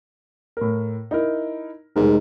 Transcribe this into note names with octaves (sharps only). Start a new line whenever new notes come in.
A2 A#4
D#4 E4 A#4
F1 G#2 G#3 A#4